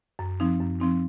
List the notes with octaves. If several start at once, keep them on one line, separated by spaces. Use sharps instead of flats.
F#2
F3 C4 D#4
F#2
F3 C4 D#4